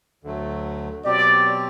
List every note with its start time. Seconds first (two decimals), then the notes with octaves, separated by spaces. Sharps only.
0.24 D2 D3 F#3 A3
1.04 B2 F#3 C4 G4 D5